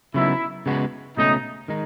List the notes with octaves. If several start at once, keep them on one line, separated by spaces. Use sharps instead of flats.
C#3 F#3 B3 D#4 E4
C#3 G#3 B3 F#4
C#2 B2 A3 C#4 D#4
D#3 G#3 D#4